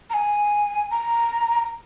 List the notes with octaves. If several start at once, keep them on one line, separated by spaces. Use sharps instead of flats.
A#5
G#5
A#5